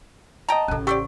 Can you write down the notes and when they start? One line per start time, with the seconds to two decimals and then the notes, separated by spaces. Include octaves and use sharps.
0.49 D#5 G5 A5 A#5
0.68 A1 C#3 C#4 A4
0.87 G4 A4 C5 D5 F#5 C#6